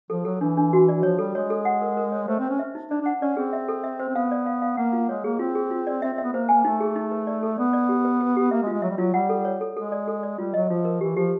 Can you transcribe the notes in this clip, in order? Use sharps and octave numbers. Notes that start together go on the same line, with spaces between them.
F3 A4
F#3 A4
E3 D4
D4
F#4
D5
F3 C#5
G3 A4
G#3 C#5
A4
F#5
A#4
A#4
C#5
A3 C5
C4
C5
C#4
E5
D#4
D4 D5
D4 F#5
C#4 D5
C4 G#4
E5
A4
E5
C5
C4
B3 F5
D5
F5
F5
A#3 F#5
F4
G#3 C#5
A#3 G#4
C4 F4
G#4
F4
D5
C4 E5
C4
E5
B3
A#3 C5
A#3 G#5
A3 D#4
G#4
D#4
B4
D5
A4
B3 D5
D5
G4
B4
B4
G4
A#3 E5
G#3
F4
G#3
F#3 E5
G3
F#3 F4
G3 F#5
A4
C#5
A4
G#3 A4
D5
A4
D5
G3 F4
F#3 D#5
F3 F4
A#4
E3 G4
F3 G4